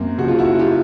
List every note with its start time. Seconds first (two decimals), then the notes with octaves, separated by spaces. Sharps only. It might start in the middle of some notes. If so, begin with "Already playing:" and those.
Already playing: F#2 A#3 C4
0.18 C#3 F3 F#4
0.28 F4
0.38 E4 F#4
0.59 F4 G4